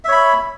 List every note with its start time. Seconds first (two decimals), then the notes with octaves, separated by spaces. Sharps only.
0.05 E5
0.08 C#5
0.12 B5